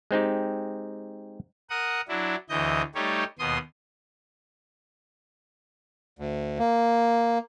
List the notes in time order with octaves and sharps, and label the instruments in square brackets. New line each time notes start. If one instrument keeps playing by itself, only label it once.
[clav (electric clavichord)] G#3 C4 D#4 G4
[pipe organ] A#4 F#5 D#6
F#3 D4 E4
D2 E3 D#5 G6
G3 A3 D#4 G4 C#5
D#2 B2 C6 D#6
[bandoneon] D2
A#3